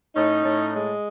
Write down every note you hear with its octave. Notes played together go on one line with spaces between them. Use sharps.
A2 C#4 D#4
A2
G#3